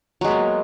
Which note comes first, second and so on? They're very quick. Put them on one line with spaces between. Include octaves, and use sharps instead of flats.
F#3 G#3 B3 A#3